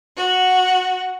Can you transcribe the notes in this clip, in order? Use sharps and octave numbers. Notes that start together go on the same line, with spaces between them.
F#4